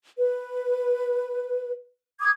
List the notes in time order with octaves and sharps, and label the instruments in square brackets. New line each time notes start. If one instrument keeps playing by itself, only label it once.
[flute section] B4
D6 D#6 G#6